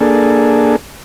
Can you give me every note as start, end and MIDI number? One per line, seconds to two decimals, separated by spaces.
0.01 0.76 58
0.01 0.76 62
0.01 0.76 68
0.01 0.76 69